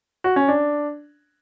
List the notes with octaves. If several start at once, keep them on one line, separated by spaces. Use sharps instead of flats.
F#4
C#4
D4